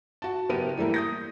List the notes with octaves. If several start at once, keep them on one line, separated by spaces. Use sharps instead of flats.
F#4 A5
F#1 B3 G4 A#4 D#7
E3 G3 A3 A#3
D#6 G6 A#6